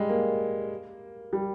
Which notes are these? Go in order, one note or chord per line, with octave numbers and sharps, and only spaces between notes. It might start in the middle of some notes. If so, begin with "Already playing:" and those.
Already playing: G3 G#3
A#3
G3